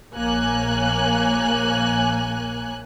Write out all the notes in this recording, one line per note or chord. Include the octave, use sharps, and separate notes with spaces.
A#1 A#3 C#5 G#5 F#6